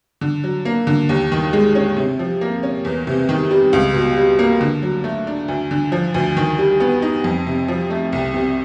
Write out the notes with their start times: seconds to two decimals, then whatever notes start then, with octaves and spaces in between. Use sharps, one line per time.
0.21 D3
0.44 F#3
0.65 A#3
0.87 D3
1.09 D#2
1.32 D#3
1.53 G#3
1.75 C#4
1.97 C3
2.19 F3
2.41 A#3
2.63 C#4
2.85 E2
3.07 C3
3.29 D#3
3.51 G3
3.73 C#2
3.94 B2
4.17 G3
4.39 A#3
4.61 D3
4.82 F#3
5.04 A3
5.27 D4
5.48 D2
5.71 D3
5.92 F3
6.14 D2
6.37 D#3
6.58 G3
6.80 B3
7.02 D#4
7.24 F2
7.46 C3
7.68 F3
7.90 A3
8.13 C2
8.34 C3